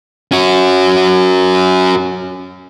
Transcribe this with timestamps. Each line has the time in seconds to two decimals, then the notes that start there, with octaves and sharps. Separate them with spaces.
0.32 C#4 F#4